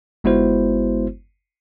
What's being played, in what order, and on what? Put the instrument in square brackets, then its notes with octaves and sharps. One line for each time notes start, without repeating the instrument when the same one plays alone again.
[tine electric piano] G1 G#3 B3 E4 F#4 C5